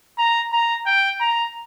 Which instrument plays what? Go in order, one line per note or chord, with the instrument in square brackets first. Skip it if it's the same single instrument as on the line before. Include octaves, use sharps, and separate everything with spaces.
[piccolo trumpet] A#5
A#5
G5
A#5